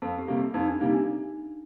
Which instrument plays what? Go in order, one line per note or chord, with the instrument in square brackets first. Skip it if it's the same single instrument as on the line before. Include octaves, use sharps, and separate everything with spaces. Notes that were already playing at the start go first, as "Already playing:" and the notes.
[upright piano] F2 [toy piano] A4
[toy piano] G4
[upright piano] C3 G3 A#3
[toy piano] G4
[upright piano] F2 [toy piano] D#4
[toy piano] D4
[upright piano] C3 G3 A#3 [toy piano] D#4
[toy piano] D4